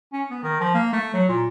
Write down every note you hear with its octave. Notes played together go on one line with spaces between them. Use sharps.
C#4
B3
D#3
F3
A#3
A3
F#3
A#2